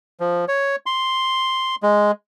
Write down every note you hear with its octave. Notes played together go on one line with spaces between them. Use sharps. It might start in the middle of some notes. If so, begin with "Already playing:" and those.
F3
C#5
C6
G#3